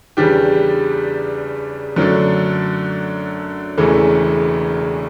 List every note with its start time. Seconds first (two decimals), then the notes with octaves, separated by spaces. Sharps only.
0.17 E2 C#3 G3 D4 G4
1.96 F#2 D3 F#3 A3 D4
3.77 E1 E2 C#3 E3 A3